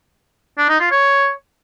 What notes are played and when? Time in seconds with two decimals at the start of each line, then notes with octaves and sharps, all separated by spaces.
0.58 D4
0.69 D#4
0.80 F4
0.91 C#5